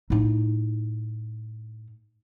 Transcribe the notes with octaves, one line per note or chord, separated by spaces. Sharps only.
A2 D#4